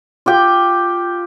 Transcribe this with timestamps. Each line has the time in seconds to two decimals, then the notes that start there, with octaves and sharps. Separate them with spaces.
0.26 F4 G4 G5